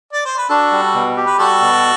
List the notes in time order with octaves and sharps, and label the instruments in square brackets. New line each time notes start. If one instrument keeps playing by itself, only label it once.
[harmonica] D5
C5
B4
[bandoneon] D4 [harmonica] F#4 A4
[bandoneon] G3
B2
G4
[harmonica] B4
[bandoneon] G3 [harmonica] F#4 A4
[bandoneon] B2